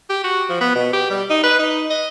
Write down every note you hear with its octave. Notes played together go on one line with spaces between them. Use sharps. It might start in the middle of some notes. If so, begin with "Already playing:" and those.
G4
F#4
F3
B3
B2
G4
G3
D#4
B4
D#4
D#5